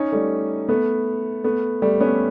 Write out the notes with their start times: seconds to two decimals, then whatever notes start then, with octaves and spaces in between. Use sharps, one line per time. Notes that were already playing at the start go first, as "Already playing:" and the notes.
Already playing: C#4 D#4
0.12 G3 A3
0.69 A3 B3
1.44 A3 B3
1.82 G3 A3
2.00 B3 C#4